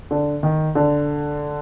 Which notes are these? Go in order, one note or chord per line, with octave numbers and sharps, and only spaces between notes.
D3
D#3
D3